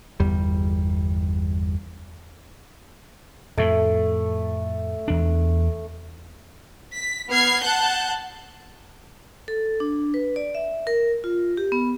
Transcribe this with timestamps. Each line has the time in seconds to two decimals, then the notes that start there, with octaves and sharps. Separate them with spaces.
0.20 G1 E2 G3
3.57 F2 A2 A3
5.08 E2 D4
6.95 B6
7.29 B3 F6 G#6 C7
7.62 F#5 A5 F#6 G6
9.48 A4
9.80 D4
10.14 B4
10.36 D5
10.55 E5
10.87 A#4
11.24 F4
11.57 G4
11.72 B3